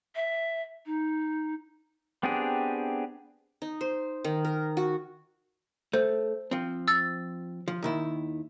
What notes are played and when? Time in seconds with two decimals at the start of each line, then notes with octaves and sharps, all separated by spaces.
0.15 E5
0.86 D#4
2.23 B3 C4 D4 G4 G#4
3.62 D#4
3.81 C5
4.24 D#3
4.45 A#4
4.77 F#4
5.93 A3 C5
6.51 F3 C4
6.88 E6 A6
7.68 F3
7.83 D#2 D#3 E4